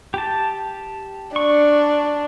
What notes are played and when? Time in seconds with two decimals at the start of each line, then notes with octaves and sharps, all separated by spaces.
0.14 G4 A5
1.36 D4 C#6